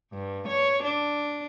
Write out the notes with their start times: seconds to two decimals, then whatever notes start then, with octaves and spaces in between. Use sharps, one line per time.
0.13 G2
0.47 C#5
0.82 D4